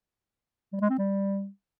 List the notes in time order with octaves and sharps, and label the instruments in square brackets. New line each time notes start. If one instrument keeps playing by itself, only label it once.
[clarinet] G3
G#3
C4
G3